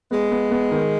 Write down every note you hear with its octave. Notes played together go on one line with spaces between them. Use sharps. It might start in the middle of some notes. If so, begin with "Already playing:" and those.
G#3 B3
B3
B3
D#3